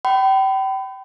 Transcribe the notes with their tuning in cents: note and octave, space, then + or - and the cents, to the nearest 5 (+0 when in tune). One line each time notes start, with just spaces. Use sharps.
G5 -30 B5 +30